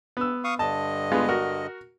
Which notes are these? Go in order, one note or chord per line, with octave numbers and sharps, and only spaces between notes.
B3 E6
F5 C#6 D#6
G2 D3 D#5 A5
G#3 B3 F4
F#4 A#4